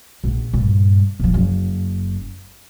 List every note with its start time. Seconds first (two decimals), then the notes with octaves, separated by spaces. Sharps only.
0.24 A#1
0.53 G2 A#2
1.20 A#2 F3
1.34 F#1